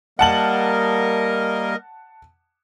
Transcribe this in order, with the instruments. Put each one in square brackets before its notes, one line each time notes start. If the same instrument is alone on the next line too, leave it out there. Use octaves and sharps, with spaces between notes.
[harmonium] G3 A#3 [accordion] A#4 D#5 [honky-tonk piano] F#5 A5 F#7